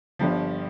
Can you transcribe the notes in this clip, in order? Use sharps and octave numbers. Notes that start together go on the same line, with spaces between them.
G1 G2 F3